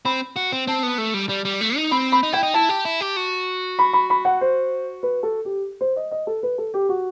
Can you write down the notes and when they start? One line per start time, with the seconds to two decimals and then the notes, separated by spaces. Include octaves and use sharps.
0.05 C4 B5
0.36 F#4
0.52 C4
0.67 C4 A5
0.83 B3
0.98 A3
1.14 G3
1.29 G3
1.45 G3
1.61 A3
1.76 D#4
1.91 C4 B5
2.12 B5
2.23 D#4
2.33 E4 G5
2.43 D#4
2.54 E4 A5
2.69 G4
2.85 E4
3.01 G4
3.17 F#4
3.79 B5
3.93 B5
4.10 B5
4.25 F#5
4.41 C5
5.03 B4
5.23 A4
5.45 G4
5.81 C5
5.96 D#5
6.11 D#5
6.27 A4
6.43 B4
6.58 A4
6.74 G4
6.89 F#4